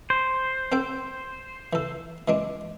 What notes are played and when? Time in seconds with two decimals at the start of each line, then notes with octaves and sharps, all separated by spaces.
0.10 C5
0.72 C4 A4 G5
1.73 E3 A4
2.28 E3 G#3 D4